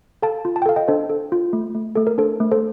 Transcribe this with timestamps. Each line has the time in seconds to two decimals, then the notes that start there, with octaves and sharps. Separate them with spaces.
0.22 A4 F5 A5
0.45 F4
0.56 A5
0.62 G5
0.66 A4 F5
0.76 D#5 G5
0.88 D4 A4 C5
1.09 A4
1.32 F4
1.53 A3
1.75 A3
1.95 A3 A4
2.07 A#4
2.18 D4 A4 C5
2.40 A3
2.51 A4 C5